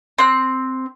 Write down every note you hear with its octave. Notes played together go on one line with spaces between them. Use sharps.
C4 F#6